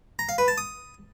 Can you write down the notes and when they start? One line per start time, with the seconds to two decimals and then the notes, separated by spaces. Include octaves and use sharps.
0.19 A#5
0.29 F5
0.38 B4
0.48 A5
0.58 D#6